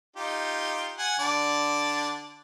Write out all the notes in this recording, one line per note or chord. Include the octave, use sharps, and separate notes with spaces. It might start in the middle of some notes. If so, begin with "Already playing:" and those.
D#4 F4 G4
F#5 G#5
D3 D5 A5